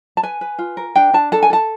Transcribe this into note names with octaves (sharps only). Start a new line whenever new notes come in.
A5
B4 G#5
B4
F4
A#4
D4 G5
D4 A5
A4 A5
G#5
A4 A5